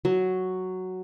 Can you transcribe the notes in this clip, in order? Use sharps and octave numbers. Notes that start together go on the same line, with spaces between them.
F#3